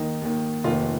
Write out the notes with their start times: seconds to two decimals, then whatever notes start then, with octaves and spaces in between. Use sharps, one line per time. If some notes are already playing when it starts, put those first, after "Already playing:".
Already playing: D#2 D#3 D#4
0.21 D#2 D#3
0.64 F1 D#2 D#3 F4